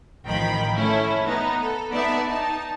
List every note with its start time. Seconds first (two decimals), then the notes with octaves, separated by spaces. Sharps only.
0.24 A1 D#3 F3 G5 B5
0.75 A3 C#4 E4 A4
1.26 B3 D#4
1.61 A4
1.91 B3 D#4 D5 E5 A5
2.27 D#4 A5